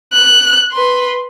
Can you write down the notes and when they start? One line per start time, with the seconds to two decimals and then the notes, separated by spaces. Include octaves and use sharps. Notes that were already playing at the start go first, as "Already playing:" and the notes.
0.13 F#6
0.72 B4 C6